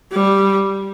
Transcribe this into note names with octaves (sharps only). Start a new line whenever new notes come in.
G3